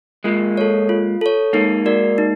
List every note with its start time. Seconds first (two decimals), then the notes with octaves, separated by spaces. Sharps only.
0.24 G#3 A#3 F4
0.57 A4 C#5
0.89 F4
1.21 A4 C#5
1.53 G#3 A#3 D#4
1.86 F#4 A#4 D5
2.18 D#4